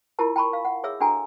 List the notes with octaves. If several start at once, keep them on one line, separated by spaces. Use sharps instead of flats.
E4 F4 G4 A#4 A5
G5 A5 B5 C#6
F5
F#5
G#4 C#5 E5 E6
D4 F#4 A4 G5 G#5 A#5